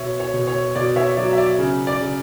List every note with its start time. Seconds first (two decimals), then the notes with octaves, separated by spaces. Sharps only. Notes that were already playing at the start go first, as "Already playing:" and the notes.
Already playing: B2 C#5 E5
0.20 C#5
0.34 B2
0.47 C#5
0.75 B2 D5
0.96 C#5 E5
1.17 F#3 D5
1.33 E5
1.38 D5
1.59 C#3
1.87 D5
2.01 C#3